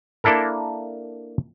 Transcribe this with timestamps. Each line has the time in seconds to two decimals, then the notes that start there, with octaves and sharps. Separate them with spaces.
0.24 A#3 D4 E4 A4 A#4